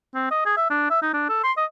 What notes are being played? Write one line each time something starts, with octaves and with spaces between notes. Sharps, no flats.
C4
D#5
G#4
E5
D4
E5
D#4
D4
A4
C6
D#5